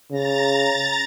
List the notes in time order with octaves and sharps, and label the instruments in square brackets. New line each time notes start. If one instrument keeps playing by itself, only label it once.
[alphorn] C#3 [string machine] A#5 A6